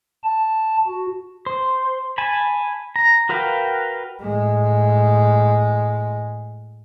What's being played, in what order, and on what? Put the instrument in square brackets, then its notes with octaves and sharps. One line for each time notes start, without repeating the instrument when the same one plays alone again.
[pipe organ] A5
F#4
[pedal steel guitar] C5
G#5 A5 B5
A#5
F#4 A#4 B4 F5 G5
[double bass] A2 G#3